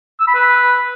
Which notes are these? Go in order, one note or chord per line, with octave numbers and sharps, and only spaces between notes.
E6
B5
B4